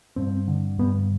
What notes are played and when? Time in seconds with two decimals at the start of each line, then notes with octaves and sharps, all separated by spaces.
0.16 G2 C4
0.48 D3
0.79 G2 B3